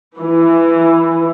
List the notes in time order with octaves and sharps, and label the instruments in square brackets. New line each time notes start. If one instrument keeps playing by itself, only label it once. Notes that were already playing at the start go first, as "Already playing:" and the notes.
[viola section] E3